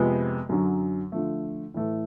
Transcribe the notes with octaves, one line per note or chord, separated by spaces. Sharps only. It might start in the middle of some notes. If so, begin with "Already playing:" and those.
Already playing: F2 C3 F3 G#3 B3
F#2 D3 F#3
D3 F3 A3
A2 E3 A3